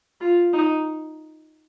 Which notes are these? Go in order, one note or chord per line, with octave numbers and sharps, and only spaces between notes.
F4
D#4